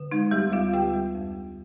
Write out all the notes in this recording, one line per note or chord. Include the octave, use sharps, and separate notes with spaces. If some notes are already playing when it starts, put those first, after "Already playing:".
Already playing: D3
G#3 D#4
D2 G3 G4
D2 F4 F5
D3 G4 G5
G3
F2
F2